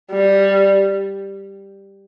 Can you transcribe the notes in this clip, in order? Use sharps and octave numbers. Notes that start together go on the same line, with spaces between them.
G3